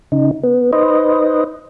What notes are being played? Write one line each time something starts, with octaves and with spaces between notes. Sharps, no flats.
C#3 D#4
B3
D#4 B4 C5 D#5